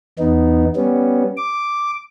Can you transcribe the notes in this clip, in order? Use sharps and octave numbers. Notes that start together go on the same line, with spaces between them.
E2 B3 D#4
G3 B3 C#4
D6